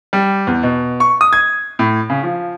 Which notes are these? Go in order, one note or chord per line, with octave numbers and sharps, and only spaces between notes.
G3
E2
B2
C#6
D#6
G#6
A2
C#3
F3